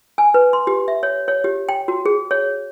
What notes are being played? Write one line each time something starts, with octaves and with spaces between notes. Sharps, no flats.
G#5
B4
C6
G4
E5
C#5
C#5
G4
G5
F#4
G#4
C#5